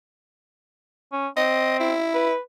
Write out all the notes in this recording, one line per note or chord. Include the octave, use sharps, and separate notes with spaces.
C#4
C4 D#5
E4
B4